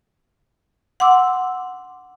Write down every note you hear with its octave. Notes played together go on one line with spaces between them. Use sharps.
F#5 C6 D6 E6